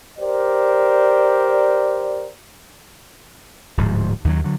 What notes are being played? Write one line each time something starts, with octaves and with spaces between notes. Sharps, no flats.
G4 A#4 C5 D5
D1 G#2 F3
D#2 D#3 F3 F#3
D3 F#3